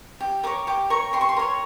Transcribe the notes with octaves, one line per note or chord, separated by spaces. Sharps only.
G4
A#4 C#5 D6
G4 D6
A#4 C#5 C#6
G4 C6
C#6
C6
A#4 C#5